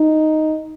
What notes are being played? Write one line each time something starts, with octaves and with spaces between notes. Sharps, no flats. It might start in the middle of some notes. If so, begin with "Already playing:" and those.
Already playing: D#4